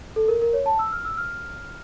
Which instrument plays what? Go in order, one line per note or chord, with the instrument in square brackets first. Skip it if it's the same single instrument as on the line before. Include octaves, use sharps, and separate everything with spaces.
[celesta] A4
A#4
A#4
C#5
A5
E6
F6
E6
F6